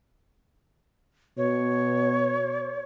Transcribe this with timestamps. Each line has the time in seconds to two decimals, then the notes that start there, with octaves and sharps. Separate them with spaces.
1.38 B2 C#5